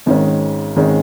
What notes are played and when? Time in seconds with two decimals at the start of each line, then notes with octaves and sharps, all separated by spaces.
0.06 G#1 G#2 D#3 G#3 C#4
0.76 G#1 G#2 D#3 G#3 C#4